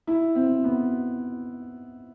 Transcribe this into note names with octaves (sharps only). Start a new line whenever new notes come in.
E4
C4
B3